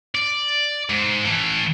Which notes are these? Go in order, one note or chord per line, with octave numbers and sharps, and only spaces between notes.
D5
G#2
E3 A3